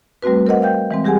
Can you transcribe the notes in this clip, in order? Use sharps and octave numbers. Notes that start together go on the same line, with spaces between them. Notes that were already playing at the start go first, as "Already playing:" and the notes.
G3 A3 C4 F#4 B4
A#4 C5 D#5 F#5
F5 G5 G6
E3 G#3 C4
G3 G4 G#4 F#5 G#5